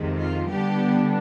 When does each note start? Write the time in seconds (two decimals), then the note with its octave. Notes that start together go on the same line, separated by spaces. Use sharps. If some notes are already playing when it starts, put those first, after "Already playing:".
Already playing: F2 C3 D#3 G#3
0.17 F4
0.48 D3 G3 B3 D4 G4